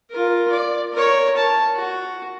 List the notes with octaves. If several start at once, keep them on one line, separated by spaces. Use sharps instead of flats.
F4 A#4
D5
A#4 C#5
A5
F#4